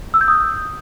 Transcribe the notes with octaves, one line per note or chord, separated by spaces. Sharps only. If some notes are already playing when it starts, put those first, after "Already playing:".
E6
G6
D#6